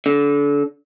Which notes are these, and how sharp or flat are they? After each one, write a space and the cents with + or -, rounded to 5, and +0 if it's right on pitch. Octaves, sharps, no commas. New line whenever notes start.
D3 -30